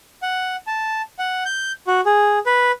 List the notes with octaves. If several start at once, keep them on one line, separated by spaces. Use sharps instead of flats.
F#5
A5
F#5
G6
F#4
G#4
B4